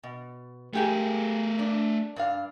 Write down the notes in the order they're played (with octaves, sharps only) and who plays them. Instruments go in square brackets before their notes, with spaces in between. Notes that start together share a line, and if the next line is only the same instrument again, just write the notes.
[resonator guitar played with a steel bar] B2
[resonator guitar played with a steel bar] G#3 G4 G#4 [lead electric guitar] A3 A#4
[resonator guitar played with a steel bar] D4
G2 D4 F5